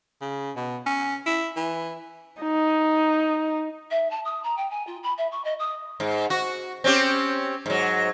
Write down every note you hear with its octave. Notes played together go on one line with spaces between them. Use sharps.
C#3
B2
C#4
E4
E3
D#4
E5
A5
D#6
A#5
G5
G#5
F4
B5
E5
C#6
D#5
D#6
G#2
F#4
C4 C#4 G4
G#2 F#3